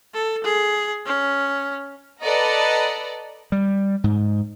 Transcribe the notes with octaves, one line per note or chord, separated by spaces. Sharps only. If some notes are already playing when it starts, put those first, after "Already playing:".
A4
G#4
C#4
A4 B4 D5 D#5 F#5 A#5
G3
G#2